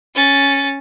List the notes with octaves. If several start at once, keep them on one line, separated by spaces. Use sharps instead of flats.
C#4 A6